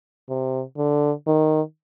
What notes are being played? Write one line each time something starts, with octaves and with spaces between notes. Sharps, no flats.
C3
D3
D#3